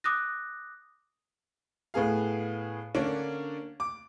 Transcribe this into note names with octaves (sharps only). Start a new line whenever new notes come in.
D6 D#6 F#6 A#6
A2 B3 G#4 F5
D3 A#3 C#4 D4
D6